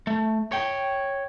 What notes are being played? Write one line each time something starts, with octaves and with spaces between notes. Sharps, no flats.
A3
C#5 G5